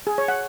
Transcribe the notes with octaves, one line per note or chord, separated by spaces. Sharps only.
G#4
C#5
F#5